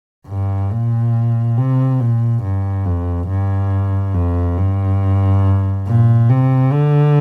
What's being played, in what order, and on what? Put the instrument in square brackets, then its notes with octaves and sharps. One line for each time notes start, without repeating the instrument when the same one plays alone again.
[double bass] G2
A#2
C3
A#2
G2
F2
G2
F2
G2
A#2
C3
D3